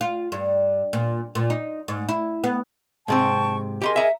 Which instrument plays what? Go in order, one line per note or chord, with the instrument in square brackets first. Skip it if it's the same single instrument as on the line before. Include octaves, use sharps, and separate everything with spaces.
[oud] F4
G2
A#2
A#2
D#4
G#2
E4
B3
[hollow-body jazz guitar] G#2 C3 C4 [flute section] G5 A5 C#6
[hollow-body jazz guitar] G4 A#5 C6 [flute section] G#4 A#4 D#5
[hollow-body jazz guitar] E5 A#5